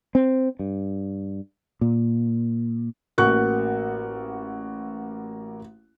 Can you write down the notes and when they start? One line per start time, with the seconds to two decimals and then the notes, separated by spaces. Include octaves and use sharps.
0.15 C4
0.59 G2
1.81 A#2
3.18 A1 A#3 F#4 C#6 F#6